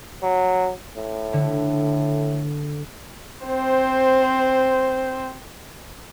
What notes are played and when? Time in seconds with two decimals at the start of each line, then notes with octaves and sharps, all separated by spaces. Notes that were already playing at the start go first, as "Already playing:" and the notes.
0.22 F#3
0.96 A2
1.33 D3
3.46 C4 C5